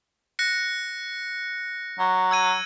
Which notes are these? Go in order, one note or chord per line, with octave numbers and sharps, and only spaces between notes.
F#6 A#6 C#7
F#3
E6 G#6 D#7